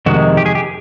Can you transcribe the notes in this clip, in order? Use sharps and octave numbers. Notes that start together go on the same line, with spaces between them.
F2 C3 D#3 G#3 F#4
G4
G#4
G4